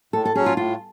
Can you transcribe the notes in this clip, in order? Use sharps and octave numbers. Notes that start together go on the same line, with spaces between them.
A2 A4
A4
F#3 C#4 G#4
F4
A2 F4